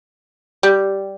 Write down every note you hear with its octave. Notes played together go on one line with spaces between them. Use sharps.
G3